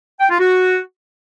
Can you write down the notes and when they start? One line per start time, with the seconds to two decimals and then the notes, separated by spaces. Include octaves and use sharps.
0.20 G5
0.30 F4
0.40 F#4